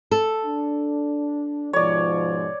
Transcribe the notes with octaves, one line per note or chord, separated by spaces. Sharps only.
A4
D4
G#2 B2 F3 C#5 D5